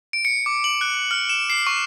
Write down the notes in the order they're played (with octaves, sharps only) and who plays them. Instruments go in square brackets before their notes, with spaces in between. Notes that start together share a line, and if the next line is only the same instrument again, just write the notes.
[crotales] D7
C#7
D6
F#7
F#6
F6
E7
C7
C#6